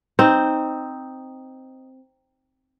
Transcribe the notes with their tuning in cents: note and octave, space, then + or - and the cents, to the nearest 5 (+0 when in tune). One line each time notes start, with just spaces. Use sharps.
C4 +0 D#4 +0